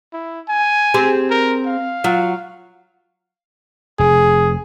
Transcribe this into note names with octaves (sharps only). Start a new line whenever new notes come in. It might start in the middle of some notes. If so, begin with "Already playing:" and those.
E4
G#5
C4 G4 G#4
A#4
F5
F#3 F4
F1 G#4